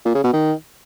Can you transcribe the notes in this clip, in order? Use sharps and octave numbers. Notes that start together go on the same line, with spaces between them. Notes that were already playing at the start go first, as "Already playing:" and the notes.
A#2
C#3
B2
D#3